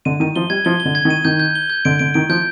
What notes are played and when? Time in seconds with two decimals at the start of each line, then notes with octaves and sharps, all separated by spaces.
0.05 D3 D#7
0.20 D#3 D#7
0.36 F3 G7
0.50 G3 G#6
0.65 F3 G7
0.80 G7
0.85 D3
0.95 G#6
1.05 D#3
1.10 D#7
1.25 D#3 G6
1.40 G6
1.55 G7
1.70 G6
1.85 D3 D7
1.99 D3 D7
2.14 D#3 D7
2.29 F3 G6